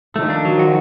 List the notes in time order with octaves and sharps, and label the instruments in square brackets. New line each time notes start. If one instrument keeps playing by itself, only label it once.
[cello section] D#3 F3 [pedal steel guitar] A3
[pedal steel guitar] D4
F#3
F#4